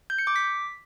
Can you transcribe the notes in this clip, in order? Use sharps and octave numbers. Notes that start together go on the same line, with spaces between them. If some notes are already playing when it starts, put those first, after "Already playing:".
G6
C#7
D6
B6